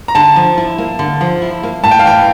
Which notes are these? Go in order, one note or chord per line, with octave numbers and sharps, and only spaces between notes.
A#5
D3 A5
F3
E4
A#3
D3
F3
E4
A#3
A2 A5
G5
F5
E3 G5